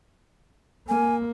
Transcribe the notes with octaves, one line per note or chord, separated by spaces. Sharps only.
A#3 G#5